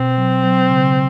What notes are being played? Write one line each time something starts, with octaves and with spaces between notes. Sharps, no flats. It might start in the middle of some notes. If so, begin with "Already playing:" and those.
Already playing: B2 C4
F#3
F#3
C#3